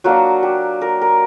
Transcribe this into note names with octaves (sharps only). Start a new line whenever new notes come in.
F#3 A#3 D4 F#4
G4
A#4
A#4